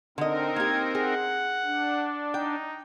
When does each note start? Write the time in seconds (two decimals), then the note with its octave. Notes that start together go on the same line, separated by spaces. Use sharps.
0.18 D3 C4 D#4 A#4 D#5
0.56 A#3 G4 G#6
0.95 G#4 F#5
1.64 D4
2.34 D#4 G5